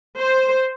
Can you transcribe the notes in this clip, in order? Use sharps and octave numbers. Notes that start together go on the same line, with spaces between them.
C5